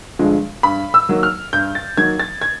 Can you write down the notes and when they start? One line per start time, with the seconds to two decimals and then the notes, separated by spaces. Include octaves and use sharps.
0.19 G2 D3 F3 G#3
0.63 G2 B5
0.94 E6
1.09 D#3 F#3 A#3
1.23 F6
1.53 G2 G6
1.75 A6
1.97 D#3 F#3 A#3 G#6
2.20 A6
2.42 G#6